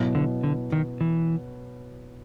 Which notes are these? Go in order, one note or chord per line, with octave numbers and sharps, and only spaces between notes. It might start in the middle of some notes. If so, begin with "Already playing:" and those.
Already playing: B2 F#3 B3 E4
D3
D3
D#3
E3